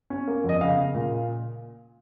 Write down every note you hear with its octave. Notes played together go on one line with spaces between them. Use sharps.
C#4
A#3
F2 D#5
C#3 F5
C#3
A#2